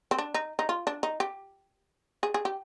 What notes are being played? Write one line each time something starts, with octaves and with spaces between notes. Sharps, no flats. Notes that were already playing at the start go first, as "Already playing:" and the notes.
C4
D4
D#4
D#4
F4
D4
D#4
G4
G#4
G#4
G4